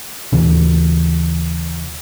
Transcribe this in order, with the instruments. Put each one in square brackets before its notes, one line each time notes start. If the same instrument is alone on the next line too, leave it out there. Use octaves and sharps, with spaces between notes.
[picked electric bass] D#2 C#3 E3